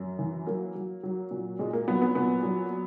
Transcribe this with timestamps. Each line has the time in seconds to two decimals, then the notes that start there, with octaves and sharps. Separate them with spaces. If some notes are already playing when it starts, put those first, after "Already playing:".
Already playing: F#2
0.19 E3
0.47 F#3 A#3
0.75 F#3
1.03 F#3
1.31 A#2
1.59 A#2 G#3
1.73 A#3
1.88 F#3 B3
2.02 B3
2.15 A#2 B3
2.43 F#3